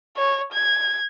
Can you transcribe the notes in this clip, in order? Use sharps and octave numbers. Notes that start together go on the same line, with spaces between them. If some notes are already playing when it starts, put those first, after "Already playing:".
C#5
G#6